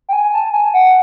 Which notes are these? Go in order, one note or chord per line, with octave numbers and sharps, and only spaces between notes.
G5
G#5
A5
G#5
F#5